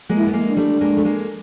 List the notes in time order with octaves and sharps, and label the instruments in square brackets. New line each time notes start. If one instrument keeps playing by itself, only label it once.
[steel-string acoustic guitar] G#3 A#3
[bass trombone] E4
[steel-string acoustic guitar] B3
G#3 A#3
[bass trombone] D4
[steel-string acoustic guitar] G3 A3
G#3 A#3
A3
G#3 A#3